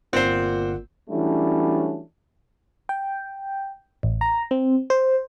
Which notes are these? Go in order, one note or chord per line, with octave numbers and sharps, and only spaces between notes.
G1 A#2 C4 F4 C5 F#5
E3 F#3 G3 A3 C#4 D4
G5
A1
A#5
C4
C5